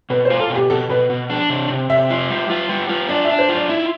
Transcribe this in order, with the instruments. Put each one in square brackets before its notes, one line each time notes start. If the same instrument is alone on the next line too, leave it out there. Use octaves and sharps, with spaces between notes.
[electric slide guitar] B2 [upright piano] B4
[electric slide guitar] F4 [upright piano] C5
[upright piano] A4
[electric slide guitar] B2
[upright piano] G4
[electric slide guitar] B2 [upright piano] A4
[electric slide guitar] B2 [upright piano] B4
[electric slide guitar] B2
D4
C3
C3
[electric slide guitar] C3 [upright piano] E5
[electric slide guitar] F4
G3
F4
G3
F4
[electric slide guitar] D4 [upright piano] D5
[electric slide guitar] D4 [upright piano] E5
[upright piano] C5
[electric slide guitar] F4
[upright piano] D5
[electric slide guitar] E4 [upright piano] E5